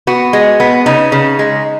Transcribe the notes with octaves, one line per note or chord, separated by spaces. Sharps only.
B3 F#4
G#3
B3
C#3 D#4
C#3
G#3